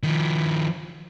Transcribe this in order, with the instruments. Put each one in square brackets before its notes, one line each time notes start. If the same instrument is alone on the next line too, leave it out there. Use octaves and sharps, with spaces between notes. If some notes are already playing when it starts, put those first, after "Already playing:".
[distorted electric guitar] D#3 F3